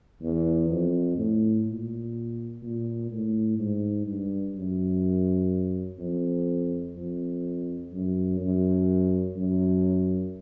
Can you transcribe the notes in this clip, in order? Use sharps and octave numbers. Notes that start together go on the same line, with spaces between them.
E2
F2
A2
A#2
A#2
A2
G#2
G2
F#2
F2
F2
F#2
F#2
F#2